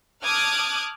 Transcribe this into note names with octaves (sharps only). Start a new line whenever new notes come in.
A5 D6 D#6 F6 F#6 G#6